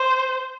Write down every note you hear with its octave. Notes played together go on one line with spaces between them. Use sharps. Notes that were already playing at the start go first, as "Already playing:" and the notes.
Already playing: C5